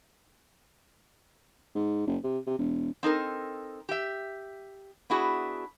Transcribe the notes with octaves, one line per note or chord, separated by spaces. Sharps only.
G#2
F#1
C3
C3
E1
C4 D#4 A4 A#4
G4 E5
B3 D4 E4 F#4 G#4